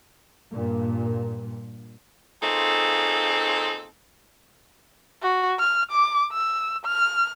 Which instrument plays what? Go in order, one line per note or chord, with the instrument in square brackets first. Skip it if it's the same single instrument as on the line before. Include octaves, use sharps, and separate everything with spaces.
[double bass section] G2 A#2
[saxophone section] A#2 C#3 C4 D#4 A4
[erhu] F#4
F6
D6
E6
F6